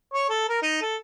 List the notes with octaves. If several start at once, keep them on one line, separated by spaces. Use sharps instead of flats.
C#5
A4
A#4
D#4
A4